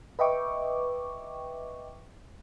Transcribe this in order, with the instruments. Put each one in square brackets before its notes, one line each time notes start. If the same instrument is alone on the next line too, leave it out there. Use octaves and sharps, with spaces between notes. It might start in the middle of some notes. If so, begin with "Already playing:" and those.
[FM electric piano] B4 D#5 E5 G5 C#6 D6